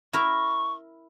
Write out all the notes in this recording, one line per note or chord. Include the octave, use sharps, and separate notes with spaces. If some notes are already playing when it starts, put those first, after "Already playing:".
E4 A#4 C#6